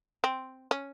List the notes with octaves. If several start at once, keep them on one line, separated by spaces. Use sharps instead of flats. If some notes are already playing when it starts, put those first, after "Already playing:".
C4
C#4